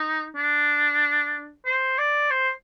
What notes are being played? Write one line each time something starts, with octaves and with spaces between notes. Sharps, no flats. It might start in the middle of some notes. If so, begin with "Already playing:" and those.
Already playing: D#4
D4
C5
D5
C5